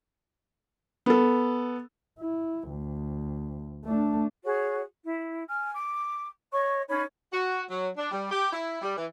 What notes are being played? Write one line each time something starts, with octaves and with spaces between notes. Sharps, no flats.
B3 A4
E4
D2
A3 D4
F#4 G#4 C#5
E4
G#5 F6
D6
C#5 D#5 C#6
C#4 D#4 C#5 B5
F#4
F#3
D4
G3
G4
E4
G3
E3